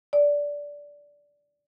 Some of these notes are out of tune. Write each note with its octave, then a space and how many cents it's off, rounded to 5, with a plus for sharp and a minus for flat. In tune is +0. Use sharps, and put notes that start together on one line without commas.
D5 -15